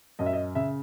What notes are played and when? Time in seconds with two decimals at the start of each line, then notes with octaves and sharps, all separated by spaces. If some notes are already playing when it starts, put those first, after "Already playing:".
0.19 F#2 D#5
0.26 E5
0.33 D#5
0.55 C#3 E5